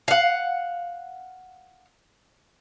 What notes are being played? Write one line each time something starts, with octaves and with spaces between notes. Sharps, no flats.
F5 F#5